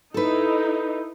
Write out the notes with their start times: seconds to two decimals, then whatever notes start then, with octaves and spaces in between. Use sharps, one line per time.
0.14 D#4 E4 A4 B4